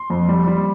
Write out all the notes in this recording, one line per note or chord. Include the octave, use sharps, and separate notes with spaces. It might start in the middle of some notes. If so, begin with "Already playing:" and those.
Already playing: C6
F2
G3
G3